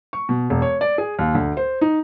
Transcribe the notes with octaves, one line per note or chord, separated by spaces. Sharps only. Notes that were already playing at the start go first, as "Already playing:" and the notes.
C#6
B2
E1
C#5
D5
G#4
D#2
D2
C5
D#4